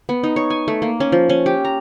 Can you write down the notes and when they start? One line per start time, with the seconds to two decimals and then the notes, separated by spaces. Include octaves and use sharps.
0.09 B3
0.23 D#4
0.36 C#5
0.50 G#5
0.68 A3
0.82 A#3
1.00 C#4
1.12 F3
1.29 C#4
1.46 G4
1.65 A#5